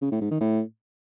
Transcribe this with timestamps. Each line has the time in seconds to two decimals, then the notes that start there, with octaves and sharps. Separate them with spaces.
0.01 C#3
0.11 A2
0.21 G#2
0.31 D#3
0.41 A2